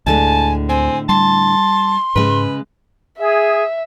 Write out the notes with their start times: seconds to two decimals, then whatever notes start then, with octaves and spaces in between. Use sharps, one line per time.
0.06 D2 A2 D3 G#3 G#5 A5
0.69 C4 G#5
1.09 G3 A5 C6
2.16 G#2 C#3 G#3 B4
3.19 G#4 E5